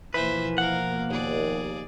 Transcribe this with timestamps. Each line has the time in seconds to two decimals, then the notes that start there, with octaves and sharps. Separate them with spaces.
0.14 B2 E3 F3 A#3 B4 C5 E5
0.58 A#4 F5 F#5
1.10 D#2 G#4 D5